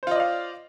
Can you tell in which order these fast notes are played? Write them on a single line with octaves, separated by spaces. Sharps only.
C5 F4 D#5 D5 F5